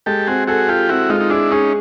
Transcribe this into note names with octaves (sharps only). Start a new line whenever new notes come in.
G#3 G4 A4
C4 F#4 G#4
F#4 G#4 A4
F4 G4 A4
C4 E4 F#4
G#3 D#4 F4
D#4
D4 E4 G#4
C#4 D#4 G#4